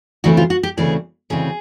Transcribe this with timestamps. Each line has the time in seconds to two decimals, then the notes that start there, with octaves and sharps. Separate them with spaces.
0.24 D2 C#3 E3 A3 C4 F#4
0.37 F4
0.50 F#4
0.63 G4
0.77 D2 C#3 E3 A3 C4 G#4
1.30 D2 C#3 E3 A3 C4 G#4